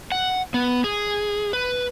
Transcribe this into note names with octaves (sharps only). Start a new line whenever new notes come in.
F#5
B3
G#4
B4